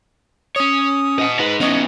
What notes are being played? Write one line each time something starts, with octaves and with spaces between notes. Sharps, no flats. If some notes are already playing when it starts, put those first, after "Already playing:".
C#4 C#5 D#6
D#5 F#5
D#4 G#4 B4
B3 C#4 D#4 E4 D#5